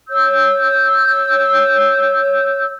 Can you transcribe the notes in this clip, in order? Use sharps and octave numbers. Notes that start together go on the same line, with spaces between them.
C#5 E6 G6